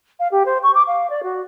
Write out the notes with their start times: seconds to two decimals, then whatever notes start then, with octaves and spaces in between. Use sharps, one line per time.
0.19 F5
0.31 G4
0.45 C5
0.63 C#6
0.74 D6
0.87 F5
1.10 D5
1.23 F#4